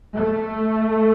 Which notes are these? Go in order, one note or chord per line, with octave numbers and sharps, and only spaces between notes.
A3